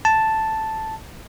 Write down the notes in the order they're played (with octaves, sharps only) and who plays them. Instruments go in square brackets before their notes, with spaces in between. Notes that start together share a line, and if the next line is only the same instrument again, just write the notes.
[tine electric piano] A5